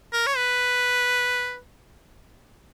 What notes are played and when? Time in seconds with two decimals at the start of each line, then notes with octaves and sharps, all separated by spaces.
0.13 A#4
0.27 C#5
0.36 B4